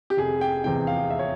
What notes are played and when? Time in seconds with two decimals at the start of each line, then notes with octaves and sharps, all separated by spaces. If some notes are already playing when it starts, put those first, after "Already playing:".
0.10 G4
0.17 F1 G#4
0.41 G5
0.64 E2 C3 E3 G5
0.87 F5
1.10 E5
1.19 C#5